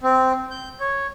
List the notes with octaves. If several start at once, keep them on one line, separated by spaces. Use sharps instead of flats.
C4
G6
C#5